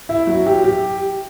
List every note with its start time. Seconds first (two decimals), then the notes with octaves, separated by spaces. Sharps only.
0.09 E4
0.27 F#3
0.46 G4
0.64 G4